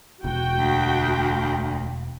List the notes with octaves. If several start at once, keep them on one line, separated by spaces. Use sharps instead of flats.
E1 F#4 G5
D2